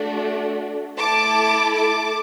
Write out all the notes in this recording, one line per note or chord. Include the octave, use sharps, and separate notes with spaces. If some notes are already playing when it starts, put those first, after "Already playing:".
Already playing: A3 D4 F#4
A3 E4 A4 A5 D6
A5 D6